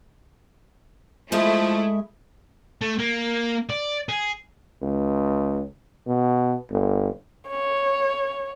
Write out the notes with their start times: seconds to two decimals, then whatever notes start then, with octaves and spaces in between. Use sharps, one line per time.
1.32 F3 G#3 A3 E4 E5
2.81 A3
2.99 A#3
3.70 D5
4.09 G#4
4.82 C#2
6.07 B2
6.70 G1
7.49 C#5